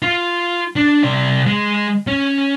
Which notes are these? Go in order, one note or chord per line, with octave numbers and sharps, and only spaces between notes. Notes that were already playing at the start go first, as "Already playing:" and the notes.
F4
D4
C3 D5
G#3
C#4